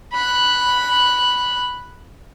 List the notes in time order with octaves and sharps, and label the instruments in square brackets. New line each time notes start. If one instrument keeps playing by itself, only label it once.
[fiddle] B5 F#6